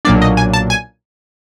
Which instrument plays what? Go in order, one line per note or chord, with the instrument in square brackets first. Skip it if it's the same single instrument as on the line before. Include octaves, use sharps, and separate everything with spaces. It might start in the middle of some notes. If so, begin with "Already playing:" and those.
[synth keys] B1 A#2 F#3 A#3 D4 D5
D#5
G#5
A5
G#5